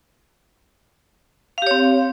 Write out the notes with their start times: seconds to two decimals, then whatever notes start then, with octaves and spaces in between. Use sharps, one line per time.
1.58 F5
1.62 G4
1.67 C#5
1.71 C4